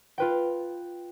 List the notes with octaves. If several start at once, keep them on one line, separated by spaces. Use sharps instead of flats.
F4 B4 G5